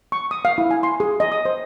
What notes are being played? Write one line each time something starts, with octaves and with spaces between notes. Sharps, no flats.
C#6
D#6
F5
E4
G#5
C6
G#4
D#5
D#6
C5